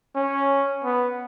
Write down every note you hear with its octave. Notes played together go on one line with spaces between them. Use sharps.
C#4
B3